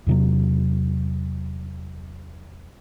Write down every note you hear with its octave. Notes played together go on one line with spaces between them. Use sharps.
E2 C3 F#3